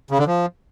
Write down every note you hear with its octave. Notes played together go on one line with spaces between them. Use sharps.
C#3
D3
F3